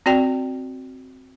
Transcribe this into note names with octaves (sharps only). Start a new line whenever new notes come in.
C4 F#4 D5 G5